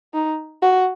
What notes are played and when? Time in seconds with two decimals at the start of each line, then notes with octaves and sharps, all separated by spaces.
0.14 D#4
0.62 F#4